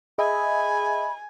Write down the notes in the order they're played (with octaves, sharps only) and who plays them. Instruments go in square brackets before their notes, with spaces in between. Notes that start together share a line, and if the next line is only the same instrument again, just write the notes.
[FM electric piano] G#4 D#5 E5 [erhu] G#5 [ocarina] B5